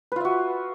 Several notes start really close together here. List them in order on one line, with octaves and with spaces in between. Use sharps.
B4 F4 E5 F#4